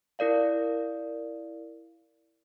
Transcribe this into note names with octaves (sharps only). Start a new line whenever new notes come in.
E4 A#4 D5 F5